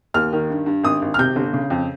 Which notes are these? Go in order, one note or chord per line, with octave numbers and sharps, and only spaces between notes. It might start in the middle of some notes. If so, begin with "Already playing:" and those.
D#2 F6
D#3
G2
G2
G#1 D#6
G#1
F6
C3 G6
G1
C#3
F2